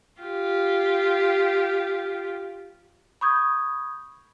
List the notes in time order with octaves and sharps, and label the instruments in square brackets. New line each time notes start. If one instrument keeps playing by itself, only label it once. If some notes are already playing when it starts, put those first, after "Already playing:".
[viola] F4 G4
[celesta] B5 C#6 D#6 G6 G#6